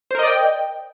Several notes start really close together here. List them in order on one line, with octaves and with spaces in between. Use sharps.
C5 A#4 D#5 D5 G5